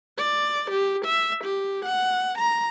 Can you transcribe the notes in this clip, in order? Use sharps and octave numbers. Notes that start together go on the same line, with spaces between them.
D5
G4
E5
G4
F#5
A#5